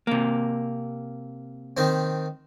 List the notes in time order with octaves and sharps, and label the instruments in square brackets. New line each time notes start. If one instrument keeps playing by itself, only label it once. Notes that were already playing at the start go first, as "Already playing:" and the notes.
[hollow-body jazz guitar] C3 A#3
[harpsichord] D#3 C4